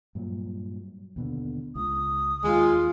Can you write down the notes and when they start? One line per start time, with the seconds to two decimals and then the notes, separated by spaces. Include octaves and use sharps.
0.15 G2 A#2 F#3
1.16 D#2 B2 D3
1.75 C#2 D#6
2.44 D#2 G#3 F4